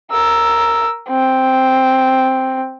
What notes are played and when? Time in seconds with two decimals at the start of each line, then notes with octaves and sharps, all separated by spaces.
0.11 A#4 E6
1.09 C4